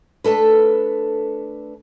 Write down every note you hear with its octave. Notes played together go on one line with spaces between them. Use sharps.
A3 D4 A4 B4